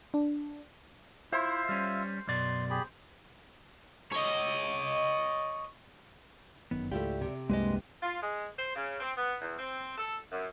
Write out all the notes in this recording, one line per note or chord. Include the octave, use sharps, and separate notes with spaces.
D4
E4 F4 C5 E5
G3 C#4
F#2 B2 D5 C6
G4 G#4 B5
C#5 D#5
G1 F#2 D#3 B3
C#2 G#2 A3 E4 F4 G4 D5
C3
C2 F#2 G3 G#3 A#3 D4 B4 D#5
F4
G#3
C5
C#3
C4
B3
E2
C4
A4
F#2